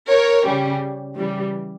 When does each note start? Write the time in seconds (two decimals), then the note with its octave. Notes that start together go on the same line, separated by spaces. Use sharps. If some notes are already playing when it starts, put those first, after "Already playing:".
0.09 A#4 C#5
0.46 C#3 G3 C#4
1.17 C#3 E3 G3